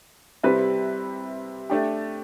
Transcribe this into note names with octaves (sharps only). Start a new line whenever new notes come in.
C3 G3 C4 E4 B4
A3 D4 G4